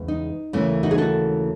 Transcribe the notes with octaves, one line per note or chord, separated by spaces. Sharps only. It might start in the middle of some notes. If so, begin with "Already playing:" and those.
Already playing: E2 C#3 G#3
D#4
D#2 C#3 E3 A3 C#4
D#4 F#4
G#4
F#4 A4